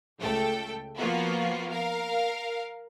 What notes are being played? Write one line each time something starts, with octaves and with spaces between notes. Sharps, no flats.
C#2 A3 A4 G5
F3 A#3 B3 F4 F#4
A#4 F5